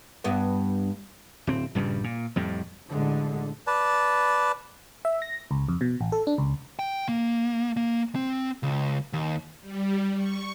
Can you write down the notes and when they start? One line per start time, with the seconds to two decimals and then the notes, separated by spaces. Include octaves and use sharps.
0.24 G2 B3
1.47 D1 C4
1.75 A#1 G2 C#3 G3
2.04 A#2
2.36 F2 A2 G3
2.89 A1 D3 G#3
3.67 B4 D5 A5
5.05 E5
5.22 A#6
5.51 C#2
5.68 F2
5.81 B2
6.01 A1
6.12 A4
6.27 D4
6.38 C#2
6.79 G5
7.09 A#3
7.77 A#3
8.15 C4
8.63 C#2
9.13 D#2
9.61 G3
10.16 C#6